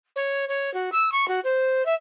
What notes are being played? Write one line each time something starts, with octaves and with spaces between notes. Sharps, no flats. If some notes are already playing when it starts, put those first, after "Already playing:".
C#5
C#5
F#4
E6
C#6
F#4
C5
E5